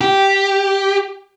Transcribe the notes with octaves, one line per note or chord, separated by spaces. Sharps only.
G4